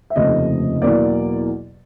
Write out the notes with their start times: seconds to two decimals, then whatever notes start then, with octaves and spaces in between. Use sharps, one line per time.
0.10 E5
0.16 F1 D#2 C#3 F3 A3 D#5
0.81 E2 B2 F#3 A#3 D5